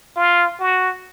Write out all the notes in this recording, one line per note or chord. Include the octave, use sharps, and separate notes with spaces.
F4
F#4